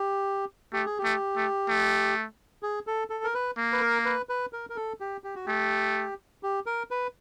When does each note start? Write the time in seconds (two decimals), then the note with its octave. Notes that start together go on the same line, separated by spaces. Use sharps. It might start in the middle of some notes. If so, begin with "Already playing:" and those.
Already playing: G4
0.73 A3 G4
0.86 G#4
0.98 G4
1.05 A3
1.36 A3
1.68 A3
2.63 G#4
2.87 A4
3.10 A4
3.24 A#4
3.34 B4
3.57 A#3
3.73 B4
3.81 A#4
4.05 B4
4.29 B4
4.53 A#4
4.70 A#4
4.76 A4
5.00 G4
5.24 G4
5.35 F#4
5.46 A3 G4
6.43 G4
6.66 A#4
6.91 B4